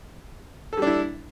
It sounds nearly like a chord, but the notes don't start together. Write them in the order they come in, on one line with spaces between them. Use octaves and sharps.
A4 G3 D4 E4